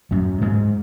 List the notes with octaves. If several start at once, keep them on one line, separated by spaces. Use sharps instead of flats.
F#2 F#3
G#2 G#3